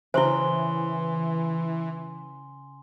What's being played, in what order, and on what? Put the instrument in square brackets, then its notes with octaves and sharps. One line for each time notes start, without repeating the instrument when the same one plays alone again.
[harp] C#3 [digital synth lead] E3 [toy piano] E4 C5 [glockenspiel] G#5 C6 G7